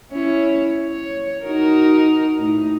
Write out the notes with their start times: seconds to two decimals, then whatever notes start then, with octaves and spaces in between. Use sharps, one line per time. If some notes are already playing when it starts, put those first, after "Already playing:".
0.11 C#4 E4 C#5
0.87 C#5
1.44 D#4 F#4 A#4
2.39 A2 D#4